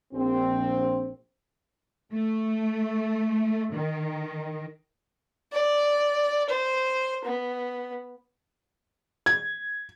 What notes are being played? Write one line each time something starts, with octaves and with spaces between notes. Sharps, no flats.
A#1 C4
A3
D#3
D5
C5
B3
G#6